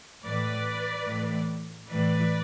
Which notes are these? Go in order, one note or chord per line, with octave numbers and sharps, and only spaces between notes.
A2 E3 B4 D5
A2 E3
A2 E3 B4 D5